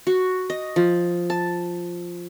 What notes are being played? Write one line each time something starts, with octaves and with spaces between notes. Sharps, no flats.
F#4
D#5
F3
A5